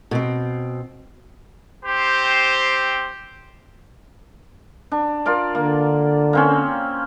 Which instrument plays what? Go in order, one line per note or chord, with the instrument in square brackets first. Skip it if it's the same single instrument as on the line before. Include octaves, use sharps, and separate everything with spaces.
[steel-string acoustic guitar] B2 C4
[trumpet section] C4 G4 C5
[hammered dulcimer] D4
F4 A#4 D5
[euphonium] D3 [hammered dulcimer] A#3
[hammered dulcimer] A#3 C4 C#4